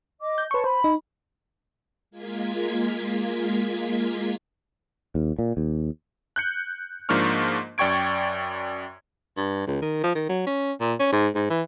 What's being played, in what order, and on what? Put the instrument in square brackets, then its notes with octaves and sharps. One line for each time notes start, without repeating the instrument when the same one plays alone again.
[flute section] D#5 D6
[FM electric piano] G6
[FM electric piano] B4 C#6 [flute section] C#5 A5 C6
[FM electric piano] C5 [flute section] B5
[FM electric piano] D#4
[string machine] G#3 A#3 F4 G#6 B6
[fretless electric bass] D#2
A#2
D#2
[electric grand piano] F#6 G6 C#7
G#2 F3 A#3 D4 C#6 F6
F#2 D5 G5 C#6 G#6 D7
[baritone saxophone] G2
C#2
D#3
F3
D#3
F#3
C#4
A#2
C#4
G#2
G#2
E3